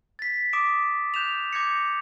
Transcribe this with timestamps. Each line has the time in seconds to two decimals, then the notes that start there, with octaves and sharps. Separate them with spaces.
0.19 A6 B6
0.53 D6 D#6 B6 D7 E7
1.14 F#6 G6 E7 F7
1.53 D6 G6 G#6 A#6 C#7